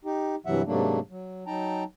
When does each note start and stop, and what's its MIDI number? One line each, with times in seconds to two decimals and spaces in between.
0.05 0.35 63
0.05 0.35 67
0.46 0.62 43
0.46 0.62 48
0.46 0.62 52
0.46 0.62 54
0.46 0.62 76
0.46 0.62 78
0.67 1.00 44
0.67 1.00 48
0.67 1.00 54
0.67 1.00 57
0.67 1.00 58
0.67 1.00 62
1.10 1.44 54
1.47 1.84 54
1.47 1.84 63
1.47 1.84 79
1.47 1.84 81
1.47 1.84 82